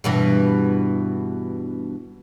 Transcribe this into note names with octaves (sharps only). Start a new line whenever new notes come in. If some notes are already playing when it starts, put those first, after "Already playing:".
G2 B2 E3